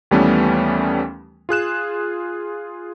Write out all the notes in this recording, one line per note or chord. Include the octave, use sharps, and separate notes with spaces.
D#2 E3 G3 A3 B3 C#4
F4 G#4 F#6 E7